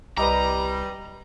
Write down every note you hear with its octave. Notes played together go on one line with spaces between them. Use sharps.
C2 G3 B4 D#5 A#5 D6